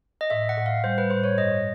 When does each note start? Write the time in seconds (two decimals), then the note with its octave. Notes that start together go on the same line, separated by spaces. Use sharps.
0.21 D#5
0.30 A2 E5
0.49 F#5
0.57 A2
0.66 F5
0.84 G3 C5
0.98 B4
1.10 A2 C5
1.23 C#5
1.37 G2 D#5